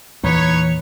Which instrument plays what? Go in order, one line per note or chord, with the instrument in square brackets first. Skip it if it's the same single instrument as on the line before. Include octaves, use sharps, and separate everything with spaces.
[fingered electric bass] E2 A#2 A#3 [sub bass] E3 [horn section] D#4 B4 C#5